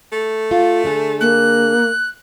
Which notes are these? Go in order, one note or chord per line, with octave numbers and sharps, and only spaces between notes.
A3
F4
D3 D4 G#4
A#3 F#6